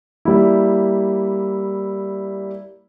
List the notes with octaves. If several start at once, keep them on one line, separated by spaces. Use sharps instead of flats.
G3 A#3 E4